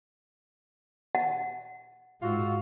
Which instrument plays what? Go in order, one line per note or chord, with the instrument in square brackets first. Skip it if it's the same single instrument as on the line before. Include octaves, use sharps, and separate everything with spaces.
[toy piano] F#5
[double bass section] G#2 [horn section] F4 F#4 E5